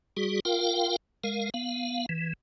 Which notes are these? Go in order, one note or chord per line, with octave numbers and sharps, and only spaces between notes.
G3 F#4 G#4
F4 A#4 F5 G5
G#3 A#4 F5
B3 F5
E3